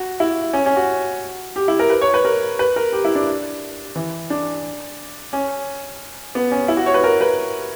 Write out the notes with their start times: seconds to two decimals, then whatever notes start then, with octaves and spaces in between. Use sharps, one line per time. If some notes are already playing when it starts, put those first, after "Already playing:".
Already playing: F#4
0.20 E4
0.53 C#4
0.66 C#4
0.76 F#4
1.56 G4
1.68 E4
1.79 A#4
1.90 B4
2.02 C#5
2.14 B4
2.25 A#4
2.59 B4
2.76 A#4
2.93 G4
3.05 E4
3.15 D4
3.96 E3
4.30 D4
5.33 C#4
6.35 B3
6.51 C#4
6.68 E4
6.77 F#4
6.86 C#5
6.94 B4
7.04 A#4
7.21 B4